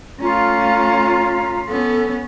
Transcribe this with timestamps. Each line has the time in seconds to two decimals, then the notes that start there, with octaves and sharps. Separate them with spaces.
0.21 A3 C#4 F4 A#5
1.68 B3 C#4 A4